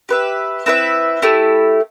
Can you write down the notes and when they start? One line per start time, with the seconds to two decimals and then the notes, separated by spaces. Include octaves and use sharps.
0.09 G4 B4 E5
0.66 C4 E4 B4 E5
1.22 A3 E4 G4